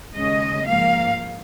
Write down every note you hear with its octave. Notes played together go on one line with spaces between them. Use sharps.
D#2 C#3 G#3 C#4 D#5
G#2 F3 A#3 F5